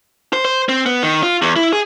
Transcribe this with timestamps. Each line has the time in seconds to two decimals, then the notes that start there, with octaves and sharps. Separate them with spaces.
0.33 C5
0.45 C5
0.69 C4
0.86 B3
1.03 D#3
1.23 F4
1.42 E2
1.56 E4
1.73 G#4